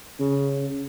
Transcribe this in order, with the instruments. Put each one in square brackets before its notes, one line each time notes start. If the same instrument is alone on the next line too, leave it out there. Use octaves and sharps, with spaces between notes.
[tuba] C#3